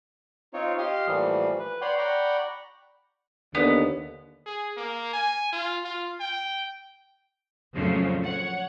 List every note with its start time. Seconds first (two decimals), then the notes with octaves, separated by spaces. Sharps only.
0.54 C4 D#4 F4 C#5
0.78 G4 D#5 F5 C6 D#6 F6
1.07 A2 E3 F3 G3 A3 A#3
1.59 B4
1.81 C#5 D5 F#5 G5 B5 C6
1.98 D5 F#5 G5 A#5 B5 C#6
3.55 D#2 D3 B3
4.46 G#4
4.77 A#3
5.13 G#5
5.52 F4
5.84 F4
6.20 G5
7.74 F2 A#2 C#3 F3 F#3 A3
8.25 C#5 F#5